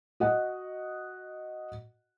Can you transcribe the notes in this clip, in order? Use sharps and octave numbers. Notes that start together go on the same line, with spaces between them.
F#4 D#5 F#5